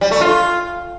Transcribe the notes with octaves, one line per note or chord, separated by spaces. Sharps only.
G3
A3
F4